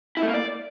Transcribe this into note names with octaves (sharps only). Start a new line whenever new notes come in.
E4
A3
A#3
D5